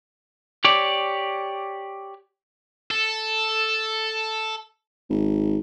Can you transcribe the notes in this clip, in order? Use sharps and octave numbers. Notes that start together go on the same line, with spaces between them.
G4 C#5 D5
A4
G#1